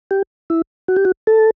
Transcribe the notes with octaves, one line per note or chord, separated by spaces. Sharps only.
G4
E4
F#4
G4
F#4
A4